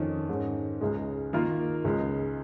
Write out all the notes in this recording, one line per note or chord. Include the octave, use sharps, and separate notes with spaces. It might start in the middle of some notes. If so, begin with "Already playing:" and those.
Already playing: F2 D#3 C#4
G#2 D#3 C#4
C#2 C#3 G#3
D#3 A#3 F4 A#4
C#2 C#3 G#3